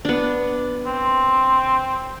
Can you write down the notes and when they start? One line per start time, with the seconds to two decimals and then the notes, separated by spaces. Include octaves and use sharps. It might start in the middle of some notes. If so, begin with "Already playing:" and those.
0.05 B3 D4
0.86 C4